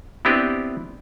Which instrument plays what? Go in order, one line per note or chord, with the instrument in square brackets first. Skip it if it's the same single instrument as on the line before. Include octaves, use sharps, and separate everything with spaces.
[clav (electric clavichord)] B3 C4 D4 E4 G4 B4